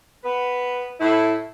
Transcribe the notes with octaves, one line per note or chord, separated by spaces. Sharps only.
B3 B4
A2 E4